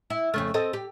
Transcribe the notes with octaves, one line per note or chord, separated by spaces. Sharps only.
E4
F2 C#3 A3
C4 A4 D#5
G4